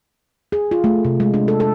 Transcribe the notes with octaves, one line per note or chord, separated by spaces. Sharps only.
G#4
F4
A3
C3
G#3
D4
A4
A4